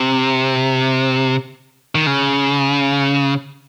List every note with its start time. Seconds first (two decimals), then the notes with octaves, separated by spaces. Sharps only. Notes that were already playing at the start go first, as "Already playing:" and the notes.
Already playing: C3
1.95 D#3
2.07 C#3